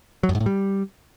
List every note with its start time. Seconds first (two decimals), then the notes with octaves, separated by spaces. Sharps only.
0.23 F#3
0.29 F#2
0.35 G#2
0.40 A2
0.46 G3